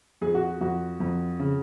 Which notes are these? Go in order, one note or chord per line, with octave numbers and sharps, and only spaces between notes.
F2 G#4
F#4
F2 F#4
F2
C#3